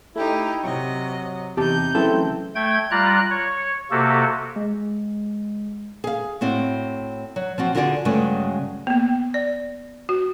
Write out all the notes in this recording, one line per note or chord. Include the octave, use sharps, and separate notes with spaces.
A3 D#4 E4 G4
C3 F#3 D#5 C#6
E2 C3 D#4 G4 A5 G6
C#3 E3 F#3 A3 C4 E4 A4
A3 G5 G#6
G3 F4 D5 A#5 F#6
C#5
C3 A#3 F#4 G4 A4
G#3
G#4 F5
A2 C4 E4 F#4
F#3
F3 C4 F#4
D3 F4 F#4 G#4 C5 D5
G2 C#3 F#3 G#3 A3
A#3 B3
D5
F#4